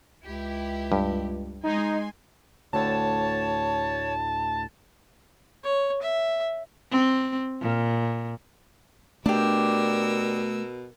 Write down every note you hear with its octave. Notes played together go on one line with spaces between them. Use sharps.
C#2 E4 G4
G2
G#3 D#4 G#5 C6
D2 A2 D3 C#5 A5
C#5
E5
C4
A#2
B2 A3 D4 G4 A#4 E6